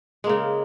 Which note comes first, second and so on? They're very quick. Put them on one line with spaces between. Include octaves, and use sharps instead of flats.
G#3 A#3 C#3